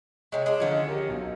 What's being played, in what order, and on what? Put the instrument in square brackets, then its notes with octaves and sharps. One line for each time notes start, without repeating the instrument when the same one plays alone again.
[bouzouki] C3 G#3 [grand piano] C#5
[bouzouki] G#3 D4
[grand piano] D3 F3 F4 [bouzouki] D#3 C#4
[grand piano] G4 A#4 D#5
B1